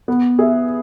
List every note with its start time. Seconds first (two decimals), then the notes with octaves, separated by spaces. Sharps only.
0.08 B3
0.39 G#4 E5